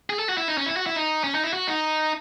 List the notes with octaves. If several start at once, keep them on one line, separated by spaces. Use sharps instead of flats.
G#4
A4
F#4
E4
D#4
C#4
E4
F#4
E4
D#4
C#4
D#4
E4
F#4
D#4